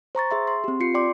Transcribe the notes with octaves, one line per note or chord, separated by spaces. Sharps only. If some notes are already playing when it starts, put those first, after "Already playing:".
C5 A#5 C#6 A6
G#4 E5 C6
C6
C4 G4
F4 C7 C#7
D5 G5 C6 D6